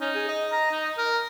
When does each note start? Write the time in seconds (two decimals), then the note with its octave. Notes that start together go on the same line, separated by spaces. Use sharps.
0.01 C#4 D#4
0.15 G#4
0.29 D#5
0.52 A#5
0.71 D#4
0.98 A#4